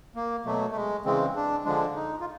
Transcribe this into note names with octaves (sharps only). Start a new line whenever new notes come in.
A#3
B2 F#3 A3
A3
G#3
C#3 E3 G#3 C4
D4
D3 F3 G#3 D4
D#4
F4